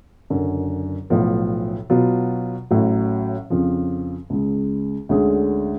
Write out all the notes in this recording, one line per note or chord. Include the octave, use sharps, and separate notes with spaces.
F#1 F#2 D3
B1 A2 F3 B3
B2 F#3 B3 F4
A1 A2 F#3
F2 C#3 F3
C#2 C#3 G#3
D2 D3 G#3 C#4 G#4